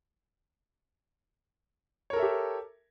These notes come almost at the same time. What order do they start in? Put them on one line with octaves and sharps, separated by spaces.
C#5 A#4 A4 E5 G4